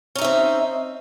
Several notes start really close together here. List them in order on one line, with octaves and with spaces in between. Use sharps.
C#4 D#4 E5 C4